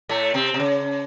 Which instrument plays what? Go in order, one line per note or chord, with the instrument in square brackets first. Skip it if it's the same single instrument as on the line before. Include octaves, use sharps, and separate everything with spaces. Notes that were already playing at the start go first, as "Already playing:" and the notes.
[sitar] A2 A3
C3 C4
C3
C#3